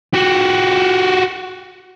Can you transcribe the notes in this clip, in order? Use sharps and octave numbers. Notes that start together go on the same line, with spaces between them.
F#4 G4